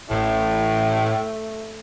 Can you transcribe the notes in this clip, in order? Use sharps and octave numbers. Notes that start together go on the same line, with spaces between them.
A1 A2 A3